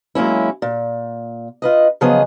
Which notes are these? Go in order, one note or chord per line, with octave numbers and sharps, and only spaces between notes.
F#3 G#3 A#3 C#4 E4
A#2
F4 B4 D#5
C#3 F3 F#3 B3 G#4 D#5